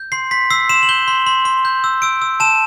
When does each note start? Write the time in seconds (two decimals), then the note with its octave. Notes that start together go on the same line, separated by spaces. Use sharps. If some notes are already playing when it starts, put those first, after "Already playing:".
Already playing: G6
0.12 C6 C7
0.31 C6 B6
0.50 E6 C7
0.69 C6 E7
0.83 F#7
0.89 G6 G7
1.08 C6
1.26 C6
1.45 C6
1.65 G6
1.84 E6
2.02 E6 D7
2.22 E6
2.40 A5 E7